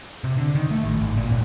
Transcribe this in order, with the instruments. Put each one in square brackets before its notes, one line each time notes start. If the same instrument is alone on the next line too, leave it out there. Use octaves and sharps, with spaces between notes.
[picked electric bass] C3
D3
D#3
A3
A1
G#1
A#2
D#1